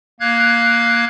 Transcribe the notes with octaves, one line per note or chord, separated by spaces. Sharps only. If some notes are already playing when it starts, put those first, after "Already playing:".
A#3 F5 F#6 G#6